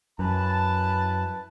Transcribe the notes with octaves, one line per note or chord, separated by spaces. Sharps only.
F#2 E4 B4 A5